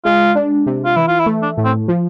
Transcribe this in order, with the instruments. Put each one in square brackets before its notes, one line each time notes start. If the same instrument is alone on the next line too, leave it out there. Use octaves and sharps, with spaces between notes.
[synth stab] G#3 [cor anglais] F4
[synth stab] D4
C3
[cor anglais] F4
[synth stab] E3 [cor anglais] E4
[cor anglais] F4
E4
[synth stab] A3
[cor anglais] D4
[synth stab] A2
[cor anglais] C4
[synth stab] F3